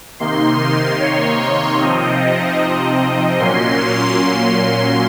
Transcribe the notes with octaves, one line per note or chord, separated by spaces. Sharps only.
C3 D#3 A#3 D#4 C6
C#5
C3 F3 C4 D#4 D#5
A#2 F#3 A#3 C#4 C6